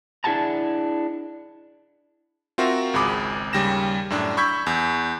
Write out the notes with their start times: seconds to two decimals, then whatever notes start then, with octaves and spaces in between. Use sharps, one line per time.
0.24 D4 E4 G#4 F#5 A5 A#5
2.58 C4 F4 F#4 A#4 E5
2.94 G#1 C#2 G#4 B5 D6
3.53 D#2 C#3 G3 G5 A#6 E7
4.10 F#2 A2 D4
4.37 B5 C#6 E6 G6 G#6 B6
4.67 E2